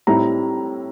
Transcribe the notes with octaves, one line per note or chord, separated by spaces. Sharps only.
A2 G3 C4 E4 A#5